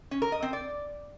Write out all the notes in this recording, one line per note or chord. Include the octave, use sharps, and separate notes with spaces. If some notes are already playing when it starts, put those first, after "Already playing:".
C#4
A#4
D#5
C4
D5